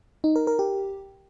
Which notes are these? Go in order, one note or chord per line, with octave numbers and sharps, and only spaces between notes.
D#4
A#4
A#4
G4